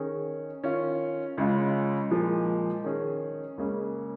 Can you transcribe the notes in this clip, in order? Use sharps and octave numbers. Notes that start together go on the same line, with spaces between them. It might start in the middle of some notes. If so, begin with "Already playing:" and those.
Already playing: D#3 C#4 G#4
D#3 C#4 F4
C#2 C#3 G#3 F4
A#2 F3 G#3
D#3 C#4 G#4
C#2 C#3 A#3 C#4 G#4